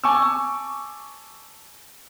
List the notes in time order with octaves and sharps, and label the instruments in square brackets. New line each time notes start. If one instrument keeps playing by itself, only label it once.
[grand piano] G#5 A5 C#6 D6 E6